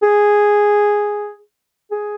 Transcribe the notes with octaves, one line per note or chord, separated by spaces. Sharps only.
G#4
G#4